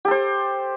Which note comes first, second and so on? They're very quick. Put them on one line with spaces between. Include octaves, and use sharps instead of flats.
G4 A4 C5